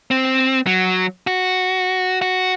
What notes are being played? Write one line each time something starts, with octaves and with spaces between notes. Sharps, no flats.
C4
F#3
F#4
F#4